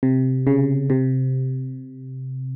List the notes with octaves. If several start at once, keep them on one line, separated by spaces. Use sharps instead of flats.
C3
C#3
C3